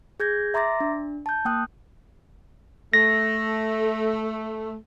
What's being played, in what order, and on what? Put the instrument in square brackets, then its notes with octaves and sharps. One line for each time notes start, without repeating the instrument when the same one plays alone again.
[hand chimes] G#4 G6 G#6 A#6
E5 A#5 C6 D6 A6 A#6
D4
A5 G6
A#3 G5 D#6 F#6
[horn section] A3 [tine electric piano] A#6